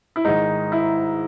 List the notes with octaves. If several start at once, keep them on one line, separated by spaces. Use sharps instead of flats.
E4
G#2 D#3 D#4
E4